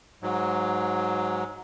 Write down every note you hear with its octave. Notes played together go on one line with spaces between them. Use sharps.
G#2 F#3